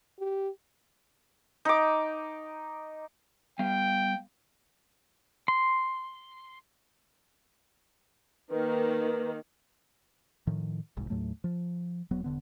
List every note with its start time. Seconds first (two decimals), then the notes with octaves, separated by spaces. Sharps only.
0.20 G4
1.65 D#4 D6
3.59 G3 B3 F5 G5
5.48 C6
8.50 D#3 A#3 B4
10.47 A2 D#3 F3
10.97 F1 C2 G#2
11.10 D#2 A2 F#3 A3
11.44 F3
12.11 E1 F#3 B3
12.24 E1 D3 B3